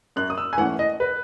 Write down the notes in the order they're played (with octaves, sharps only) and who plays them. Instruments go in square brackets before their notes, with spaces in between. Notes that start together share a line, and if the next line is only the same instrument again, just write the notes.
[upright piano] F#2 F#6
D#6
E6
G#5
E3 A3 C#4 F#5
D#5
B4